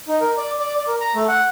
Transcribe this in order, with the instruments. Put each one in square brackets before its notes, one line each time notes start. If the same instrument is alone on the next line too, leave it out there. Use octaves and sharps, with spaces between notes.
[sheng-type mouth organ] D#4
A#4
D5
D5
D5
A#4
A#5
A3
F#5